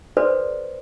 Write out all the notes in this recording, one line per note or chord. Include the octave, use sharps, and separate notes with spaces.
F#4 A4 B4 C5 D5